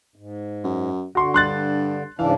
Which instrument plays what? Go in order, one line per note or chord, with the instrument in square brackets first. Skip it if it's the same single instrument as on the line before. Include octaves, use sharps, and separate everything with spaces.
[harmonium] G#2
[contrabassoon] F#2
[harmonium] D3 [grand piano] F#4 C6 C#6
[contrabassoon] G2 [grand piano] C6 F#6 A6
[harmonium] G#2 C#3 D4 [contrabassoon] E3 [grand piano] F5